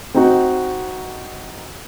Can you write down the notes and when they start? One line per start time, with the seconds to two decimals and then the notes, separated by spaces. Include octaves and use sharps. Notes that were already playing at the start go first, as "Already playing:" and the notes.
0.14 C4 D#4 F#4